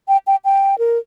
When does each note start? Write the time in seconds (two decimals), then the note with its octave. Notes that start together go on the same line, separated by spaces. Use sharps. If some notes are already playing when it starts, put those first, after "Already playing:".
0.08 G5
0.27 G5
0.45 G5
0.79 A#4